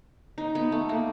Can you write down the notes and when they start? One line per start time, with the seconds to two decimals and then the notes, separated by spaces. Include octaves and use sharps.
0.38 D#4
0.55 B3
0.72 A3
0.89 A#3